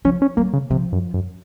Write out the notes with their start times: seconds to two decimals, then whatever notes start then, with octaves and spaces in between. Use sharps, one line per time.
0.05 F3 C#4
0.22 C#4
0.37 F#3 A#3
0.53 C#3
0.70 C3 F3
0.92 F#2
1.14 F#2